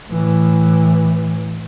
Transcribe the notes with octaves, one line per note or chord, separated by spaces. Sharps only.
A2 E3